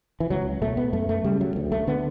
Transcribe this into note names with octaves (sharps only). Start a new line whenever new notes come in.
E3
C#2 F#3
B2 A3
B3
F#2 A3
A3
C#3 G3
F#3
D2
A3
D3 B3